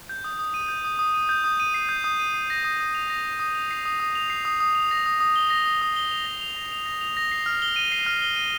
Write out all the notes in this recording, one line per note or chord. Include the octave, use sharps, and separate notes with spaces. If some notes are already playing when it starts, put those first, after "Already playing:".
G6
D#6
D#6
D#7
G6
D#6
D#6
D#7
G6
D#6
D#7
C7
G6
D#6
D#7
C7
A#6
D#6
D#6
F7
A#6
D#6
D#6
F7
C7
D#6
D#6
F7
C7
D#6
D#6
F7
A#6
D#6
D#6
G7
A#6
D#6
D#6
G7
F7
A#6
F7
A#6
F7
A#6
F7
A#6
C7
F6
G7
D#7
C7
F6
G7
D#7